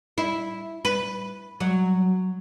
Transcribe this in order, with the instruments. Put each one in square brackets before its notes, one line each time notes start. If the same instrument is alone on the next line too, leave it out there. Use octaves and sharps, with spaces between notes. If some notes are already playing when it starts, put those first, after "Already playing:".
[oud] E4
B4
F#3